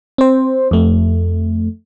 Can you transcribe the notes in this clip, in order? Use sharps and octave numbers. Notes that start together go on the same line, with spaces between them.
C4 C5
F2 A3